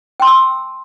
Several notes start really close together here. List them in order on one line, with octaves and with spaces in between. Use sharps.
G5 C6 A5 E6